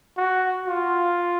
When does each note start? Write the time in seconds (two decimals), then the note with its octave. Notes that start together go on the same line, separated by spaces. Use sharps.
0.17 F#4
0.68 F4